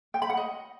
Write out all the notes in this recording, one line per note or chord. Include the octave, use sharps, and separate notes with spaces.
G5
B5
F#5
D#5